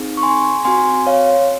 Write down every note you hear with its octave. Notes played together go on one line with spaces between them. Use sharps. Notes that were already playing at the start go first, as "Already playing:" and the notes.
Already playing: C4 D#4 G#4
C#6
G#5 C6
C4 F#4 G#5 C6
C#5 F5